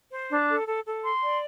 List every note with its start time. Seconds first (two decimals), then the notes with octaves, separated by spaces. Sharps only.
0.12 C5
0.30 D4
0.48 A4
0.67 A4
0.86 A4
1.04 C6
1.23 D5